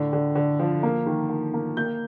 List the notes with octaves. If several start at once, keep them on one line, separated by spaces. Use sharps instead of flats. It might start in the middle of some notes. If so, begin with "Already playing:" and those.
Already playing: A2 D3
D3
D3
F3
A#3
D#3
A#3
A#3
A#3 G6